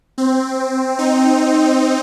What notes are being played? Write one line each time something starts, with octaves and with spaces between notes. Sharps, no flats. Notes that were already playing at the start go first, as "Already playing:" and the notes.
C4
D#4